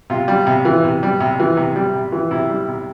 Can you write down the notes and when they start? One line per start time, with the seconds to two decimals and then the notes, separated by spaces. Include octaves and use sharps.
0.10 C3 F4
0.28 G3
0.47 C3
0.65 E3
0.84 C3
1.03 G3
1.20 C3
1.40 E3
1.57 C3
1.76 G3
1.95 C3
2.12 E3
2.31 C3 E4
2.50 G3
2.68 C3